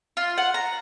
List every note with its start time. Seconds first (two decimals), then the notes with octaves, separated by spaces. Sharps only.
0.17 F4
0.38 F#5
0.54 A#5